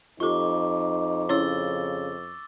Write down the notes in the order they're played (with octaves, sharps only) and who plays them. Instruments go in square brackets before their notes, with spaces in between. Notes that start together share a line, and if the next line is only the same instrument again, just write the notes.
[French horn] F2 [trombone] D#4 [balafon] F4 G4 A4 [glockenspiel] C#6 D6
[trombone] C#3 [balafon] C#4 E4 C#5 [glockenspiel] E6 A6 G7